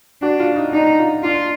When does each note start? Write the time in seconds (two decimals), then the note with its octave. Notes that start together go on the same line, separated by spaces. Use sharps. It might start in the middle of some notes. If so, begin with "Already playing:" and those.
0.22 D4 F#4
0.40 F4
0.56 D#4
0.73 D4 D#4
0.99 F4
1.23 D4 F4